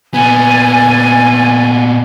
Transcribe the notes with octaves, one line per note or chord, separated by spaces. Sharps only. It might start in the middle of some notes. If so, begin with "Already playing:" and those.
A#2 B3 D5 G#5